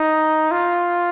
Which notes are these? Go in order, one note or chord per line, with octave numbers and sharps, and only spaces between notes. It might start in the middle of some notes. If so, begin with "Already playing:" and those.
Already playing: D#4
F4